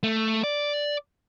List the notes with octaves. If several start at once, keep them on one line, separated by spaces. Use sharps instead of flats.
A3
D5